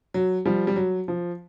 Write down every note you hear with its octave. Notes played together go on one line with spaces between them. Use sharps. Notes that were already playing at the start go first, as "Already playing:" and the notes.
F#3
F3 G3
G3
F#3
F3